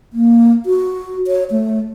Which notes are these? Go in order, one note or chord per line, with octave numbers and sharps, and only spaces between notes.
A#3
F#4
C#5
A3